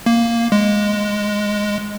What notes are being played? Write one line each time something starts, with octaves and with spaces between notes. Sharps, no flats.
A#3
G#3